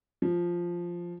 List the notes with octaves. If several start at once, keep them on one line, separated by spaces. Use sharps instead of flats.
F3